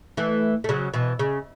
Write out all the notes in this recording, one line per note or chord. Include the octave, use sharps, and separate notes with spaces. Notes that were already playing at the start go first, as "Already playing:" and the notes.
E3 A3
A3
C#3 F#3
B2 E3
C#3